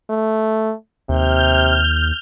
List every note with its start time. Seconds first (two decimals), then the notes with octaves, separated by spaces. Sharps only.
0.10 A3
1.09 D#2 C3 F6 G6